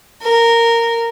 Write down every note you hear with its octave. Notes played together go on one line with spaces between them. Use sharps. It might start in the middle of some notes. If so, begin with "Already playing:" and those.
A#4